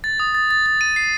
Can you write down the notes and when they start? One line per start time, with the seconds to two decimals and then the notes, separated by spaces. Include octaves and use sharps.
0.04 A6
0.20 D#6
0.35 A6
0.51 A6
0.66 A6
0.81 D#7
0.96 C7